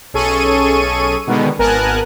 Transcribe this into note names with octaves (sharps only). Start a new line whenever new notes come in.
B1 C#4 G#4 A4 C#6 D#7
B2 D3 D#3 G#3 B3
G#1 B3 A#4 G#5 A5 F#6